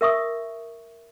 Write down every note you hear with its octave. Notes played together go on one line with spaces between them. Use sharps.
A#4 E5 C#6 D#6